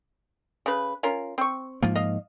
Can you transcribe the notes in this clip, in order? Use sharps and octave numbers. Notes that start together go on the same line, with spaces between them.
C#3 B4
C#4 F4 A#4
C4 C#6
G#2 F3 A#3 F4
D#5 F5